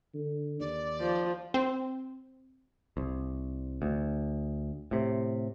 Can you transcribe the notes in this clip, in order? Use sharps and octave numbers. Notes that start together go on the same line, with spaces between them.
D3
D#2 D5
F3
C4
C2
D2
A2 C3